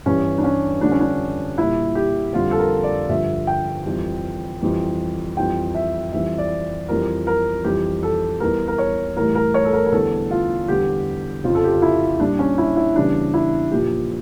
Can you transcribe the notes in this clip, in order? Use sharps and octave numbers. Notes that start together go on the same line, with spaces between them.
G2 E3 G3 C#4
D4
C#4
F2 D3 G3 D4
C#4
D4
A#2 G3 E4
G4
F2 D3 G3 F4
A4
A#4
D5
G2 D3 F3 E5
G5
F2 E3 G3
F2 E3 G3
F2 E3 G3 G5
E5
F2 E3 G3 E5
D5
F2 E3 G3 A#4
A#4
F2 E3 G3 G4
A4
E2 E3 G3 A#4
A#4
C#5
A2 E3 G3 A#4
A#4
C#5
A4
A#4
A#4
E2 D3 G3 A4
F4
E2 D3 G3 G4
F2 C#3 F3 F4
A4
G4
F4
E4
A#2 G3 D4
C#4
E4
E4
E2 C#3 E3 G3 D4
E4
A#2 F3 G4